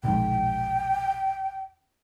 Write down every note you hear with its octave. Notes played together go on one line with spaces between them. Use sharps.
E1 A#1 G#2 G5